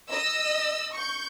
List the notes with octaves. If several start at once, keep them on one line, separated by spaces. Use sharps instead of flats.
D#5 E6
C#6 G6